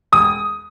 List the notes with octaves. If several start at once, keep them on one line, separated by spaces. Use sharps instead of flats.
E1 D#6